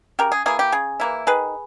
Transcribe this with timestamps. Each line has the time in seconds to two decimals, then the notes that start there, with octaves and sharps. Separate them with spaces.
0.19 C#3 G4 A#4
0.32 G#4
0.46 E3 A#3 E4 G#4
0.59 G4
0.72 C#3 G#4
1.00 E3 A#3 E4
1.27 D#3 G#4 B4